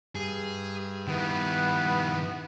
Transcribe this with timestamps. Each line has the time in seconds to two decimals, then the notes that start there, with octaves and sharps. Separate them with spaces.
0.15 G2 G#4
1.08 D#3 B3 E4